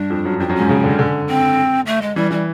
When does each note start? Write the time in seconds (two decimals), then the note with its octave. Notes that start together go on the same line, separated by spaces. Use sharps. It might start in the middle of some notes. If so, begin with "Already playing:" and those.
Already playing: G2 D4
0.10 F2
0.25 F#2
0.40 F2 D4
0.49 F#2
0.55 G#2 C#4
0.69 C#3
0.84 D3
0.99 D3
1.27 C4
1.86 A3
2.01 G#3
2.16 E3 G3
2.31 E3 G3